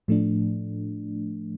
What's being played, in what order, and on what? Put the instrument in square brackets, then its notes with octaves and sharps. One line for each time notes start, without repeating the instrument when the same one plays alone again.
[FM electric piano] A2 F3 A3 D4